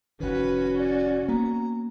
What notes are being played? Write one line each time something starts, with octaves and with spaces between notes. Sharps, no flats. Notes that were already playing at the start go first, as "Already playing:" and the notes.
F1 D#3 C#4 F#4 B4
D5
A#3 B3 A#5